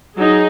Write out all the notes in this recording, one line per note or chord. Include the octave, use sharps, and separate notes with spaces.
F#3 D#4 G#4